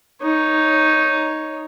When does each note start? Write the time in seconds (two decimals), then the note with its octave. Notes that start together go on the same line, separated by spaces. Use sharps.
0.23 D#4 C#5